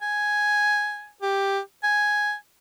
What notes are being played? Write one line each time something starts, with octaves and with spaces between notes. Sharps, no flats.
G#5
G4
G#5